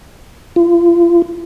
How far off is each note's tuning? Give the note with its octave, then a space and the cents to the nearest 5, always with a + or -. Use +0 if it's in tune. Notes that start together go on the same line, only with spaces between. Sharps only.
F4 -35